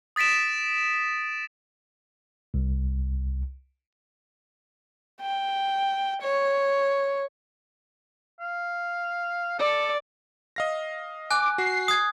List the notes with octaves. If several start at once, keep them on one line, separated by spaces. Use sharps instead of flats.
D#6 A6 B6 D7 E7
C2
G5
C#5
F5
A4 D5
D#5 F5 A#6
G#5 D6 F#6
F#4 C7
D#6 G#6